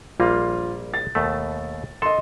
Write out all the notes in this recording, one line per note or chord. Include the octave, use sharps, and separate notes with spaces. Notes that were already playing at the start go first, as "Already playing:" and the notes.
A#1 G3 A#3 F4
A6
D#2 B2 A3
D3 A4 D#5 C6